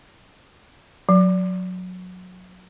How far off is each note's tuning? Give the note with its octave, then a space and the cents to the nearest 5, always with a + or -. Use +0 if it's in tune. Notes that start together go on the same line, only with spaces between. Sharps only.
F#3 -20